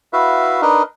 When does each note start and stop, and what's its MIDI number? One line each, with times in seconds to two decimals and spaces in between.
0.13 0.61 64
0.13 0.61 66
0.13 0.61 71
0.13 0.61 76
0.13 0.61 77
0.62 0.82 62
0.62 0.82 63
0.62 0.82 70
0.62 0.82 71
0.62 0.82 75